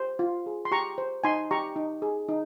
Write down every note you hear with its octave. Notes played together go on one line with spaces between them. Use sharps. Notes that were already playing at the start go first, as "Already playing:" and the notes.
Already playing: G4 C5
F4
G#4
C6
G4 A#5 C#6
C5
D#4 G#5 C6
G4 A#5 C#6
D#4
G#4
D#4